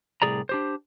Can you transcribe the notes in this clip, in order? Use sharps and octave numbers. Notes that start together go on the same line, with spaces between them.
C2 A2 E3 G#4 D5 A#5
D4 G4 C5